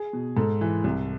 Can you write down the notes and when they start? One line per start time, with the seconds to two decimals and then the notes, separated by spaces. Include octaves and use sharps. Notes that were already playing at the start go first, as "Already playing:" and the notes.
Already playing: G#4
0.13 B2
0.37 G#2 A4
0.61 E3
0.84 C2